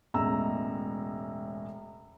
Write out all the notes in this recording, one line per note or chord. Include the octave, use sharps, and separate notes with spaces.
E1 A2 C#3 G#3 A#5 E6